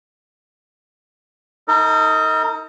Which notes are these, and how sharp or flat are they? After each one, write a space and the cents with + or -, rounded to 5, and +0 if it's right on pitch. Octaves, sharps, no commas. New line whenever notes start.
D#4 +25 A#4 -40